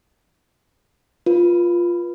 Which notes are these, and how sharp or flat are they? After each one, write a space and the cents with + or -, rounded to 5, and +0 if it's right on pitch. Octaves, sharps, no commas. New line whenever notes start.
F4 +0 B4 -25